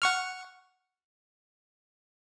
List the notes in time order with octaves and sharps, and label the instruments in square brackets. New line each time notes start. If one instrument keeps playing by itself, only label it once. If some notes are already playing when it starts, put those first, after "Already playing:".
[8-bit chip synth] F#5 C#6 F6